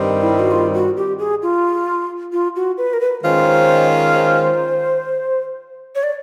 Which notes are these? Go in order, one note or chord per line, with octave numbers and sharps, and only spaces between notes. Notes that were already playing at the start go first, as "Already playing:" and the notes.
Already playing: G2 D#3 G3 C4
E4
F#4
F4
F#4
G4
G#4
F4
F4
F#4
B4
A#4
B4
D#3 G#3 C#4 F4 C5
C5
C#5
D5